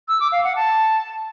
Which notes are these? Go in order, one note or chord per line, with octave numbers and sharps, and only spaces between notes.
E6
D6
F5
F#5
A5